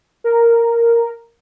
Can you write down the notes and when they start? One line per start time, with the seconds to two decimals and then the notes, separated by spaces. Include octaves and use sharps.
0.24 A#4